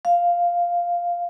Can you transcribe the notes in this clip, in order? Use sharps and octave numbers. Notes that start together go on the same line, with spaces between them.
F5